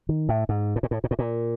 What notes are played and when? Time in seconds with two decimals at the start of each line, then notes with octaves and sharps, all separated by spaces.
0.09 D#3
0.29 A2
0.49 G#2
0.76 A2
0.83 A#2
0.91 A2
1.04 A#2
1.11 A2
1.19 A#2